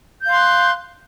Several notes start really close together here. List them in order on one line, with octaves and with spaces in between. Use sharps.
G6 F5 C6 F#6